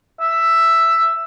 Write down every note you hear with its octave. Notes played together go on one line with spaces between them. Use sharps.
E5